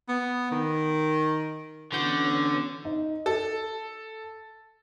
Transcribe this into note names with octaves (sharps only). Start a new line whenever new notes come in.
B3
D#3
D3 E3 B3 C#4 F#4 G6
D#4
A4